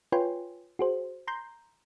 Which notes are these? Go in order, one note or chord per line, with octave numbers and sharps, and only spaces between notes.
F4 B4 C#5 G5 G#5 C6
F#4 G#4 C5
A#5 C6 G6